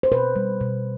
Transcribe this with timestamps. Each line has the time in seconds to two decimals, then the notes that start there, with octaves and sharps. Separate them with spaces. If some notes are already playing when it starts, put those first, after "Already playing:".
0.03 C5
0.12 B2 B4
0.36 G3
0.61 B2